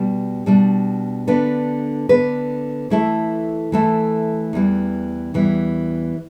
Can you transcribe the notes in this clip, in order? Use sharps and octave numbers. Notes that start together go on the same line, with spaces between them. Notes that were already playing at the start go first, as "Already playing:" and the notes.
Already playing: B2 G3
B2 G3 D4
D3 B3 D4 B4
D3 B3 D4 B4
E3 A3 E4 A4
E3 A3 E4 A4
E2 E3 G3
E2 E3 G3